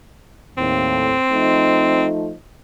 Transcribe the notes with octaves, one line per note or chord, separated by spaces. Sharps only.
D#2 A2 C4
F3 A3 D#4